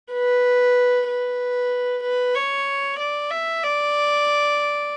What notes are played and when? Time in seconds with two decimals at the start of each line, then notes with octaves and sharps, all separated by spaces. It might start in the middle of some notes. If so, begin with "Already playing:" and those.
0.13 B4
1.08 B4
2.03 B4
2.35 C#5
2.99 D5
3.31 E5
3.63 D5